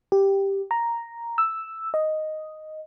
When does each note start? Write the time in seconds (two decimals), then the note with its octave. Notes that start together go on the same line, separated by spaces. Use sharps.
0.12 G4
0.71 A#5
1.38 E6
1.94 D#5